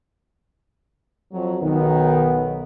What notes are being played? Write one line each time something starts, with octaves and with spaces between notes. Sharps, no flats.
F2 F#3
B1 D#3 B3